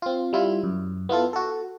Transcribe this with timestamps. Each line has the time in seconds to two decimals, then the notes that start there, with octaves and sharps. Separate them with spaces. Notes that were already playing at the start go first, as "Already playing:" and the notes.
0.02 C4 F4
0.33 G3 E4 F4
0.64 F#2
1.09 B3 E4 F4 A4
1.33 F#4 A4